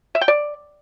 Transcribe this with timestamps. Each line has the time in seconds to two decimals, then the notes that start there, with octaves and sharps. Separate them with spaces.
0.15 E5
0.21 G5
0.28 D5